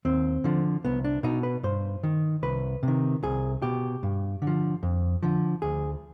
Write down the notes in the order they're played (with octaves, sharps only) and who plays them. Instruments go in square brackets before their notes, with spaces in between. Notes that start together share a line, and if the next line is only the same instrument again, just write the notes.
[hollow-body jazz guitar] D#2 C4
D3 F3
C2 B3
D4
B2 D#4
B4
G2 C5
D#3
C2 B4
C3 D#3
C2 G#4
B2 G4
G2
D3
F3
F2
D3 F3
D2 G#4